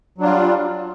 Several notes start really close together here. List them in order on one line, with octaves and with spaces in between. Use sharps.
F#3 D4 F4 G3